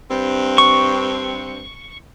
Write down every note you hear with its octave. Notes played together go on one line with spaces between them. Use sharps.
G2 C4
C#6